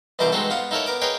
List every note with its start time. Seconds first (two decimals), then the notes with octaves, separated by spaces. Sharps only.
0.19 C2 B2 E3 D#4 C5 D6
0.32 G#3 C4 D#4 F#4 G4 A4
0.50 B3 F4 F5 F#5
0.71 D#4 E4 A4 A#4 C#5
0.86 B3 A#4 D6
1.01 G#4 A#4 B4 C#5 D#5 G5